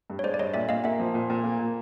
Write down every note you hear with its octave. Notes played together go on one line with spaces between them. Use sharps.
G2
C#5
G#3 C5 D5
D5
G2 C#5 D#5
A#2 D5 E5
A#2 D#5 F5
A#3 E5 F#5
F3
A#2
A#2
A#3
A#2